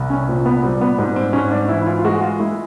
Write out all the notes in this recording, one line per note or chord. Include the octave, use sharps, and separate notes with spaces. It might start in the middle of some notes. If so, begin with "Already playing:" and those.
Already playing: C2
C#4
A#2 C4
B3
G3 C4
B3
G#2 C4
C4
G#2 C#4
D4
E3 E4
E4
F4
F4
G#3 F#4
F4
G#3 E4